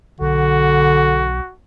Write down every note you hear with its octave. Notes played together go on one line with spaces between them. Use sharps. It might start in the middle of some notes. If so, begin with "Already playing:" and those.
B1 D3 F#4